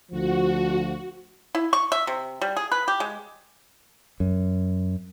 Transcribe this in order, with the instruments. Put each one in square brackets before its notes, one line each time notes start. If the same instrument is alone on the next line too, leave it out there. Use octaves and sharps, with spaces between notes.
[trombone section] D2 F3 [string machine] F#4
[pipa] E4
C#6
E5
C3
G3
G#4
B4
G4
G#3
[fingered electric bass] F#2